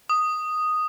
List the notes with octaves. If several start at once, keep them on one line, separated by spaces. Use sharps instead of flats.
D#6